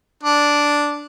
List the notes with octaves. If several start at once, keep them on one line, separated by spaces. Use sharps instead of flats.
D4